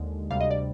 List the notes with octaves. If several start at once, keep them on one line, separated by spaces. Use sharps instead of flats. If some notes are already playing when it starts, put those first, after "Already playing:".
Already playing: D#2 D3 G#3
D2 C3 G3 F5
D#5
D5